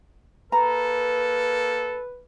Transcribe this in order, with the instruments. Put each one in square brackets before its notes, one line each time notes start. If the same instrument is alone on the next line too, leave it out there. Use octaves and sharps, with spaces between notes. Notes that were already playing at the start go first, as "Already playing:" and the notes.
[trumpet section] A#3 A4 [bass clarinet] B4 [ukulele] A#5